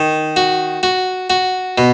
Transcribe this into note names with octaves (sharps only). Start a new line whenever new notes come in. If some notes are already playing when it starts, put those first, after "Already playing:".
Already playing: D#3
F#4
F#4
F#4
B2